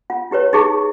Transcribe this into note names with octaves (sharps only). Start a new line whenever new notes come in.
F4 F#5
E4 G4 B4 C#5
D#4 E4 G4 G#4 C#6